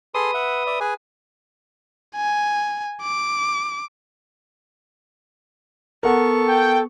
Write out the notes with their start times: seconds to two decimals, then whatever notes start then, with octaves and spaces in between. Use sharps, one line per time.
0.15 G#4 A4 B4 C6 D#6
0.34 E5 F#5
0.66 D5 E5
0.80 G#4 B4 G#5
2.16 G#5
3.02 D6
6.03 B3 A4 A#4 F#5 C#6
6.48 G5